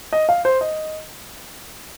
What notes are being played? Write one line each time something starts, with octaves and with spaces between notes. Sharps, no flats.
D#5
F5
C5
D#5